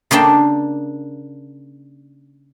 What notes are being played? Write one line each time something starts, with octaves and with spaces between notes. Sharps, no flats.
C#3 A#3 D4 G5 A5